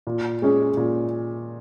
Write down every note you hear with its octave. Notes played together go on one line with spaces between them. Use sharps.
A#2
G#3 C#4 G#4 C#5
A#2